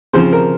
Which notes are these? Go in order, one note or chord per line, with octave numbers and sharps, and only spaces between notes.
C#3 F3 C4 C5
A#4